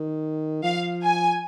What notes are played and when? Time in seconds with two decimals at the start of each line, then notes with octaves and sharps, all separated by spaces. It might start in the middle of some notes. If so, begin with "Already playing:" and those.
Already playing: D#3
0.63 F3 F5
1.03 G#5